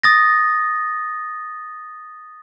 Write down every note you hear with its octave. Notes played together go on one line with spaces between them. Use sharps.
D#6 A6 A#6